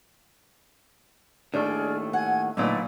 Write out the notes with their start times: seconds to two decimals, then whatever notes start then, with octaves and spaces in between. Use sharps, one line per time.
1.54 D#2 A2 A3 D4 G#4 D5 F6
2.13 F#5 G#5 G#6
2.57 B1 A#2 D3 A3 D#4 B4 D5 E6